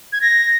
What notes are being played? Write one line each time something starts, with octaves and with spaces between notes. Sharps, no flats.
G#6
A#6